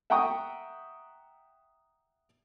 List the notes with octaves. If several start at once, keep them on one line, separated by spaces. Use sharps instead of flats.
E5 F#5 G5 A#5 C#6 D#6